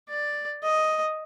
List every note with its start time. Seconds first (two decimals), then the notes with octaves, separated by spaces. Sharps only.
0.09 D5
0.63 D#5